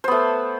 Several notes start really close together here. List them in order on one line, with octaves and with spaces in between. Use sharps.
C5 B3 A3